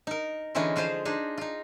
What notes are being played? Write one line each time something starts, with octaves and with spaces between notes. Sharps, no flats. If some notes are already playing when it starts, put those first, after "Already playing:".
D#4 A#4
D3 E3 G#3 C#4 D#4 F4
F3 F4 G#4 C5 F5
D4 D#4 G#4
D#4 F4